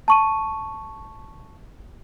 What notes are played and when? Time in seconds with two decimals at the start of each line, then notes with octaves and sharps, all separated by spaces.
0.08 A5 C#6 D#7